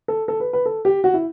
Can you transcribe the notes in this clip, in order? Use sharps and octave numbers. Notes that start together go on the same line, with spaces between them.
A4
A4
B4
B4
A4
G4
F#4
E4